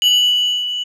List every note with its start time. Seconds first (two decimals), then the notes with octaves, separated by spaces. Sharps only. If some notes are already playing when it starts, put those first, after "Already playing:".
0.02 F#7